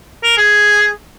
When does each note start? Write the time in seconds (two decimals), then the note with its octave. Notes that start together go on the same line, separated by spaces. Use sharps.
0.23 A#4
0.37 G#4